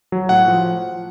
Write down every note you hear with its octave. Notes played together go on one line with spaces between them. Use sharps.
F#3
A2 F#5
F3